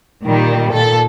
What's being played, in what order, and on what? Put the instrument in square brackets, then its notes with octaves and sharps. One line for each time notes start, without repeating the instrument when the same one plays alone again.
[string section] A#2 D#3 G3
A#2 A4